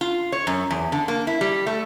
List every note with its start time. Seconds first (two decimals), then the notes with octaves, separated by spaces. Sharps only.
0.01 F4
0.32 C#5
0.47 F#2
0.70 E2
0.92 D3
1.08 A#3
1.27 E4
1.41 G3
1.66 A3